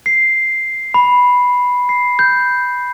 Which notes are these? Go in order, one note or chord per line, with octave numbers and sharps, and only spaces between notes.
C7
B5
C7
G6